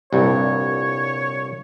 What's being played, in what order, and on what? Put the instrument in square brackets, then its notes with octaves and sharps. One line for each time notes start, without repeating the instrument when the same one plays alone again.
[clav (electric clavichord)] C2 G2 A#2 [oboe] C#5